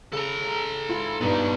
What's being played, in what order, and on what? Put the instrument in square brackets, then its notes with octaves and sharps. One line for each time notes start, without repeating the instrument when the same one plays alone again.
[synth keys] C#3 [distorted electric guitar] A4 A#5
[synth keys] G#2 E4 F4
[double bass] G2 [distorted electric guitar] B3 D#4